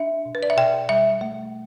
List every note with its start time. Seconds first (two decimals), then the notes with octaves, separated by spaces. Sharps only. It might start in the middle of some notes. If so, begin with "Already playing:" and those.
Already playing: D4 E5
0.25 B2
0.35 B4
0.43 D5
0.50 E5
0.57 B2 G5
0.89 G3 E5
1.21 A3